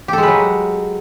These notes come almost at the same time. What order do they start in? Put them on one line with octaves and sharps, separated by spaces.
G4 A4 G#3 B4 F#3